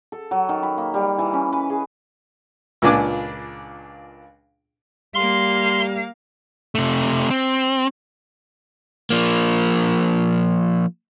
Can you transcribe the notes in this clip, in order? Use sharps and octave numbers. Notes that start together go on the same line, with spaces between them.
A4
F#3
D#3
B5
A#3
G3
E3
C#4
B4
G#4
C#2 A#2 D4 G#5 D6
G3 A#3 F5 C6
C3 A3
C4
F3 A#3